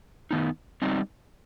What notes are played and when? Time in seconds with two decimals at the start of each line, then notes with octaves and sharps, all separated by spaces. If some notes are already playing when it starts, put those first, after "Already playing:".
0.31 D#3 B3 D#4
0.82 G3 C4 D#4